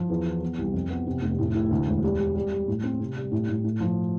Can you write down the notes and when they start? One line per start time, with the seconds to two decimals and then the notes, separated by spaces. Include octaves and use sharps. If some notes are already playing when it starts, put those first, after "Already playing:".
Already playing: F3
0.09 E2
0.25 E3
0.42 B3
0.58 C2
0.74 F2
0.90 B3
1.07 C3
1.22 F1
1.38 A2
1.55 E4
1.71 D2
1.87 E1
2.03 G3
2.19 G3
2.36 G3
2.52 G3
2.68 A2
2.84 C4
3.00 C3
3.16 G3
3.32 A2
3.49 A2
3.64 A2
3.80 F3